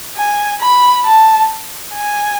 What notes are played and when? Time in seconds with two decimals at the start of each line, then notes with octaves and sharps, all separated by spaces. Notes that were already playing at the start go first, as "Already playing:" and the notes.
0.18 G#5
0.61 B5
1.06 A5
1.94 G#5